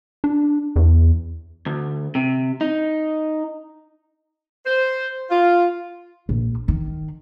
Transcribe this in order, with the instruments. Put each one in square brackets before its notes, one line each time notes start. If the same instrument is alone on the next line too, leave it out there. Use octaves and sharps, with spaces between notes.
[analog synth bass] D4
E2
[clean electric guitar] D2
C3
D#4
[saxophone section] C5
F4
[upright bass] A#1
D#3